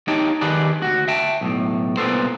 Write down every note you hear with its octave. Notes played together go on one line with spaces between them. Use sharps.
D#4 G4 C#5 G5 A5
D#3 G4 G#4 B4 D5 A5
D2 G#2 F#4
E5 G5 A5
B1 A2
C2 A#2 G#3 B3 A4 C5